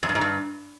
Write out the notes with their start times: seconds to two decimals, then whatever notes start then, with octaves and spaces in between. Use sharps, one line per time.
0.03 F2
0.09 G2
0.15 G#2
0.21 G2